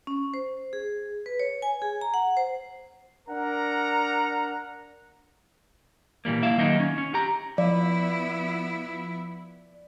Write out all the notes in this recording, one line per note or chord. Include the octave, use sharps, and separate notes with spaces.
C#4
C5
G#4
B4
C#5
G#5
G#4
A#5
F#5
C5
D4 A#4 F#5 A#5
A#2 E3 G3 A#3
A#3 E4 E5 F5
D#3 F#3 A#3 D#4
C#4
C#4
G4 A#5
F3 B3 E4 D5